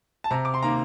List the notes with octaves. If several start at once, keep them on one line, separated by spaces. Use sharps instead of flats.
A5
C3 A#5
D6
C6
D#3 A#3 A#5